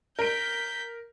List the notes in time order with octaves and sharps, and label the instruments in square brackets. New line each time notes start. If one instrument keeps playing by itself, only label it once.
[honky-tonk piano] A#4 D7 [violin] G6 B6